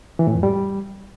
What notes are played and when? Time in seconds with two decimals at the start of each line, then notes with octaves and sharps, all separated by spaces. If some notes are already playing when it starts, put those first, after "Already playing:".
0.19 E3
0.27 A2
0.35 F2
0.43 G3